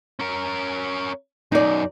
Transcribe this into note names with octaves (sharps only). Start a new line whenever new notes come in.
C#4 A#4
F#2 B2 D#4 D5